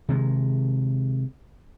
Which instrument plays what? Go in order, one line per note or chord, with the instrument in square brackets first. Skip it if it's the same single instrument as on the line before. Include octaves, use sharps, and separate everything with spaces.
[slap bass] C3 D#3 G#3